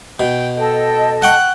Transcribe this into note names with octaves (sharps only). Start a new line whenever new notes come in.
B2 G5
A4 D#5 G5 A5
F#5 G5 C#6 F#6